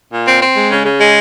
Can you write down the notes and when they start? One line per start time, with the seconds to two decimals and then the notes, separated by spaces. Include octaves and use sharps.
0.13 A#2
0.27 C4
0.42 C4
0.56 G#3
0.71 C#3
0.86 C#3
1.00 G#3